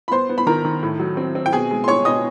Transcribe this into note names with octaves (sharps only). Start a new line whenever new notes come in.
B5
B3 C5 C6
B3
B5
D#3 A#4 A#5
D#3
A2
F#3
C4
C4
G5
B2 G#4 G#5
G#3
C6
G#3 C#5 C#6
B2 D#5 D#6